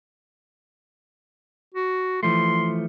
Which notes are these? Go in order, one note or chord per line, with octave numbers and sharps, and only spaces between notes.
F#4
E3 F3 A3 C6